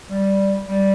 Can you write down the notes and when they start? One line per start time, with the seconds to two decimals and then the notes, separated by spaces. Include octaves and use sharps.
0.10 G3
0.69 G3